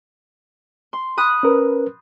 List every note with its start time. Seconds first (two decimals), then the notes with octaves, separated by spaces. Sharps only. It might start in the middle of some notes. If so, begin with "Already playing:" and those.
0.93 C6
1.17 B5 D#6 F#6
1.43 C#4 A#4 B4